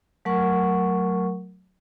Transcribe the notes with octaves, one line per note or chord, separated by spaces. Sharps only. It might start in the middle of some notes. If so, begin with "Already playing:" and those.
F#3 A3 A#4 F#5 C#6